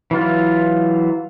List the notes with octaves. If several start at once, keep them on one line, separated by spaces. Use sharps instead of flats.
E3 F#3 F4